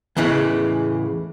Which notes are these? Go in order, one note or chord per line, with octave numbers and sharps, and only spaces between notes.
E2 A2 C#3 E3 G#3